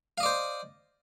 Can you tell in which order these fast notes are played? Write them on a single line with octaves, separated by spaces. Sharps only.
F5 D#5 D5 C5